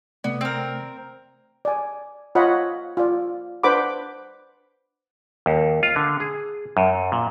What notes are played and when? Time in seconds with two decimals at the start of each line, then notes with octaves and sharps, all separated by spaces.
0.24 C3 A3 B3 D5
0.41 C4 A#4
1.65 D5 G#5
2.35 F4 C#5 D#5 F#5 B5
2.97 F4 D5
3.63 D4 B4 C5 F#5 B5 D6
5.46 D#2
5.83 F4
5.96 D3
6.20 G#4
6.77 F#2
7.12 A#2